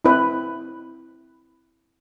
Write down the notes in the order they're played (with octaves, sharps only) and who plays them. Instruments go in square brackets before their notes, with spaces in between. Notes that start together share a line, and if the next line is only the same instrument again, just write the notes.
[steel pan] C4 E4 B4